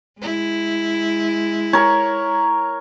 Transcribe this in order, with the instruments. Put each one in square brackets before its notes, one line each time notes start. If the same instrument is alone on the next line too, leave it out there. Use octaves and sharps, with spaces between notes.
[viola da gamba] G#3 E4
[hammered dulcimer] A#4 C#5